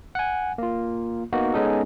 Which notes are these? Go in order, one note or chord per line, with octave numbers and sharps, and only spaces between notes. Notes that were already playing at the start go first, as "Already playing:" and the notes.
F#5 G#5
A#3 F4
A#3 B3 D#4 F#4
G#3 B3 C#4 D#4 G#4 A4